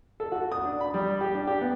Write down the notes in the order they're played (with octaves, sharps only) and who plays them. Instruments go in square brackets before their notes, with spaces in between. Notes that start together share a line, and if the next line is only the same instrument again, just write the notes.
[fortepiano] A4
F#4
D#6
D4
B5
G3
G4
D4
G4
B3